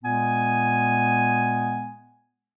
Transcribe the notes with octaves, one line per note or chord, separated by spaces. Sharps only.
A#2 G#3 B3 G#5